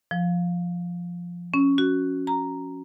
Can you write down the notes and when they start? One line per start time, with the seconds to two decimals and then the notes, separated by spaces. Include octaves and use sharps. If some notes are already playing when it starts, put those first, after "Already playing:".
0.11 F3
1.54 C#4
1.78 F#4
2.27 A#5